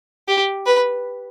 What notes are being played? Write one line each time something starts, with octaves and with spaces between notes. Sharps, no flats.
G4
B4